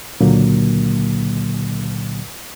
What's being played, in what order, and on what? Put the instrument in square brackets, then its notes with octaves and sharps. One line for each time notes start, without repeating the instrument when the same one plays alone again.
[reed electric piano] C#2 A#2 D3 F#3 A#3